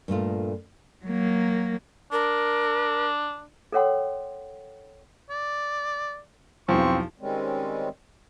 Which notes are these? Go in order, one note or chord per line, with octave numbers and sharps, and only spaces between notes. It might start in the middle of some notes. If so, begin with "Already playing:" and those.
G2 A#2 A3 F4
F#3 A#3
D4 A#4
A4 A#4 C#5 F#5 G5 C6
D5
B1 E2 F3 C4 C#6
D#3 G3 G#3 C4 C#4